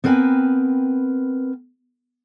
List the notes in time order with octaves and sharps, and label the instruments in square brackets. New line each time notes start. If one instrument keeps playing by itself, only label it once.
[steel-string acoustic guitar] B3 C4 A#4 B4 G5 G#5